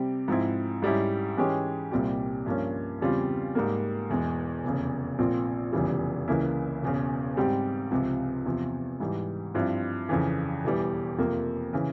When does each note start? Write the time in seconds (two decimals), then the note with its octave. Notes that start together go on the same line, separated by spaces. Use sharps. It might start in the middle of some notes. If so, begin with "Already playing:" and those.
Already playing: C3 G3 C4 G4
0.28 G#2 F3 C4 E4
0.82 G#2 G3 C#4 E4
1.37 G#2 E3 G#3 C#4 G4
1.91 C2 A#2 G3 C4 G4
2.46 G2 F3 A#3 C#4
3.00 E2 C#3 G3 C4 F4
3.55 G#2 G3 A#3
4.10 E1 E2 E3 G#3
4.64 F1 E2 C#3
5.18 A#1 A#2 F3 C4 F4
5.72 F1 E2 C#3 E3 G3
6.28 C#2 C#3 E3 A#3 E4
6.82 E1 E2 C#3
7.37 G#2 G3 C4 G4
7.91 C#2 C3 F3
8.46 E2 C3 F3
9.00 G#2 E3 G3
9.54 G2 F3 C4 E4
10.09 F2 C#3 E3
10.64 E1 E2 E3 G3
11.18 F2 C3 F3 A#3
11.73 C#3 E3